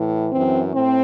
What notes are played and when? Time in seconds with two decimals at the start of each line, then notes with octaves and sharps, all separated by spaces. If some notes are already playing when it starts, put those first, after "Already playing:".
Already playing: A2 E3
0.31 F#2 E3 C4
0.73 A2 C4